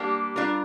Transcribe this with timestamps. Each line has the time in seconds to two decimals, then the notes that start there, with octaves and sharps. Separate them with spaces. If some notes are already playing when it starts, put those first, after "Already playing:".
Already playing: G3 A#3 D4 G4
0.36 G3 D4 F4 A#4